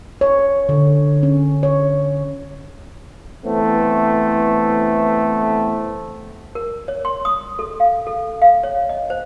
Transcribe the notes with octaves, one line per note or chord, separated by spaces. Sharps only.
C#5
D3
C#4
C#5
E3 A3 B3 C4
A#4
C#5
C6
D#6
A4
F5
A4
F5
C#5
D#5
C5